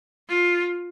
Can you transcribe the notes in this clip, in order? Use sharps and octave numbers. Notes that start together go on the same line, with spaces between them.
F4